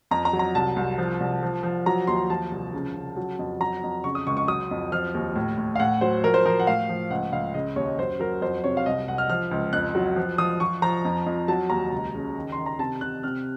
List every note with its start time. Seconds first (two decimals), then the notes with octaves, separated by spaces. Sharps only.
0.11 F2 A#5
0.25 A#5
0.33 F#3
0.39 A#5
0.55 C2 A5
0.76 C2
0.98 F3
1.20 C2
1.43 F3
1.63 F3
1.86 F#3 A#5
2.07 D#2 C6
2.30 F3 A5
2.51 C2
2.73 C#3
2.95 C#3
3.16 F#3
3.39 F2
3.60 F#3 A#5
3.83 F2
4.04 C#3 C#6
4.15 D#6
4.27 C#2 C#6
4.37 C#6
4.48 F#3 D#6
4.71 F2
4.92 F3 F6
5.14 D#2
5.35 A2
5.58 A2
5.76 F5
5.80 A2 F#5
6.01 F#3 C5
6.23 F3 A#4
6.34 C5
6.46 F3 A#4
6.60 F#5
6.67 A2 F5
6.89 F3
7.10 C#2 F#5
7.32 C#2 F5
7.54 C#3 D#5
7.76 D#2 C#5
7.99 F#2 C5
8.20 F#3 A#4
8.41 F2 C5
8.64 C3 C#5
8.77 F5
8.86 C2 D#5
9.08 C2 F#5
9.18 F6
9.29 F3 F6
9.51 C#2
9.73 F2 F#6
9.95 F#3
10.16 F3
10.38 F3 D#6
10.60 F3 C#6
10.82 F3 A#5
11.05 F2
11.26 F2
11.48 F#3 A5
11.70 D#2 A#5
11.92 C#2
12.14 C#3
12.36 D#3
12.52 C6
12.58 D#3
12.66 A#5
12.79 C3 A5
13.01 C3 F#6
13.23 C3 F6